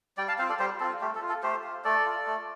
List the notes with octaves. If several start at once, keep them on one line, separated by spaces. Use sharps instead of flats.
G3 D5 G5
F5 A5
C4 F4 C5 F5
A4 D5
G3 G4 C5
C4 F4 A4
A3 G4
A4
F4
A4
A3 G4 C5
F4
A3 A4 D5
F4
A3